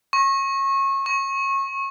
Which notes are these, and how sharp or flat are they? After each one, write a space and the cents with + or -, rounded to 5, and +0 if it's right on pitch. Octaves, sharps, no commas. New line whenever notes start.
C#6 -25
C#6 -20